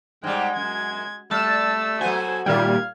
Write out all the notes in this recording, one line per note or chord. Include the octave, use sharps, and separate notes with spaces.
G#2 G3 G#3 G5
F#2 G#6
G3 A3 A5 E6
F#3 B3 F#4 A4 C5 G#5
A#2 D#3 G3 E5 F5 G#6